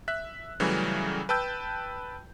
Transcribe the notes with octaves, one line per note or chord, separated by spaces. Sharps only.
E5 F#6 B6
C#3 E3 F#3 G3 A3 C#4
B4 G5 A5 E6 G6